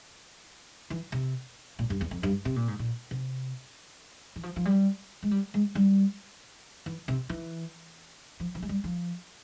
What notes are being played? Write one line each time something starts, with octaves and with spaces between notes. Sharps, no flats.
E3
C3
A#2
G2
E2
F2
G2
C3
A#2
G#2
A#2
C3
E3
F3
F3
G3
G#3
G3
G#3
G3
E3
C3
E3
F3
F3
G#3
G3
F3